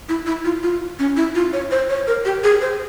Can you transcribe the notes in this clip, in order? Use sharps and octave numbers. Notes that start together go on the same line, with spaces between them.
E4
E4
F4
F4
C#4
E4
F4
C#5
C5
C#5
A#4
G4
G#4
C5